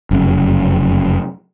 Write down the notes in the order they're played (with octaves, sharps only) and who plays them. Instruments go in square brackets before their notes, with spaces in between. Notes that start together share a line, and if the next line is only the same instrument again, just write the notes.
[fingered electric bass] F1 F#2 C#3